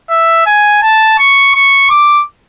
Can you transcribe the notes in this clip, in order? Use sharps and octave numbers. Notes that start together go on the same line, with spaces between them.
E5
G#5
A5
C#6
C#6
D6